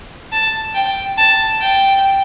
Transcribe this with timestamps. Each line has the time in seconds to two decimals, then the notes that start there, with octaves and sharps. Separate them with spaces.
0.32 A5
0.74 G5
1.18 A5
1.61 G5